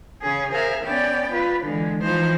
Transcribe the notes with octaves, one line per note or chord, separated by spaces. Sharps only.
C#3 C#4 G#4
G#4 A#4 C5 E5 F5
B3 C#4 D5 G5
F4 B4
D3 E3 G#3
E3 F3 D#4 C5